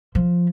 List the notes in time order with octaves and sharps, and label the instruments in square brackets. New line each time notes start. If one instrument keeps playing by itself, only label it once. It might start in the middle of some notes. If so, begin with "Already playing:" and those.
[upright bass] F3